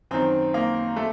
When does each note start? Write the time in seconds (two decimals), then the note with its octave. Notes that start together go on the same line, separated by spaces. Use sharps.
0.11 F#2 D#3 C4
0.54 A#3
0.96 A3